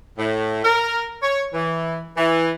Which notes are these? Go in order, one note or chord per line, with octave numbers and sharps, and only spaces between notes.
A2
A#4
C#5
E3
E3